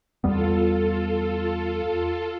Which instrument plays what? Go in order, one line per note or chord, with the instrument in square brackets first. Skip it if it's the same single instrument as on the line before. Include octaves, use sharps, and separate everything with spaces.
[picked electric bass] E2 G3 B3 [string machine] F4 A4